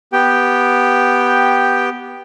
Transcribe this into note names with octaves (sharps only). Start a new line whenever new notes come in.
B3 G4 G5